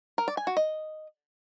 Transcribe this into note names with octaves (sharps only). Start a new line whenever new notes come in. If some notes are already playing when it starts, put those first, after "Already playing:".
A#4
D5
G#5
F#4
D#5